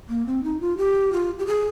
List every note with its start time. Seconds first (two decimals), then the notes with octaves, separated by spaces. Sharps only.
0.09 A#3
0.26 C4
0.43 D#4
0.60 F4
0.78 G4
1.13 F4
1.39 G4
1.47 G#4